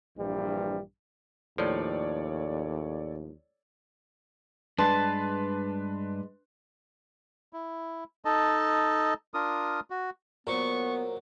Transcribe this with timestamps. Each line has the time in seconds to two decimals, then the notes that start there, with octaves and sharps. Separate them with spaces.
0.17 A#1 G2 E3 G3
1.58 D#2 A2 F3 A4 C#5 D5
4.78 G2 G#3 D4 B4 A5 C6
7.53 E4
8.25 D#4 A4 D#5 A5
9.34 D4 F4 A#4 D#6
9.90 F#4
10.47 A#2 F#3 B3 A#4 C5 C#6